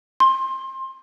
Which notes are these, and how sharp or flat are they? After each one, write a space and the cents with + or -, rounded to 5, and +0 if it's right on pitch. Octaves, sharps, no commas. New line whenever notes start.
C6 +25